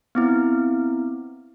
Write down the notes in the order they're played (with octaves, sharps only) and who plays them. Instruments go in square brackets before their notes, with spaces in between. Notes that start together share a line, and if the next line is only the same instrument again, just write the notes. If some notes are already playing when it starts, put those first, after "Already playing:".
[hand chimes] B3 C4 E4